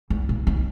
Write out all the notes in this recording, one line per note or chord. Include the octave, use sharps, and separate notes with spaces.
E2
A#2
D#3